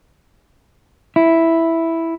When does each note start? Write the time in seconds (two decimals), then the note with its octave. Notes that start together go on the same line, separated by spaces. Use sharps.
1.16 E4